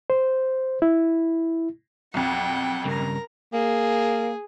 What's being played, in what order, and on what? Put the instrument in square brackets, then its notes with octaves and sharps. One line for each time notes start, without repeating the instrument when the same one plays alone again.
[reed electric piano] C5
E4
[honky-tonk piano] B1 F2 [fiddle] F#5 G5
[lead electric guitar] G2 C#3 [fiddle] A#4 A#5
[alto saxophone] A#3 [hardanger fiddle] G#4